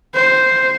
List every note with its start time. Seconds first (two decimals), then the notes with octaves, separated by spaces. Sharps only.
0.14 C5